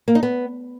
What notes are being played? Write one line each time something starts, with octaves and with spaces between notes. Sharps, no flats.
A#3
D#4
B3